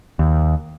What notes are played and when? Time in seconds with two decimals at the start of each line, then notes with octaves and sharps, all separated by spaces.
0.19 D#2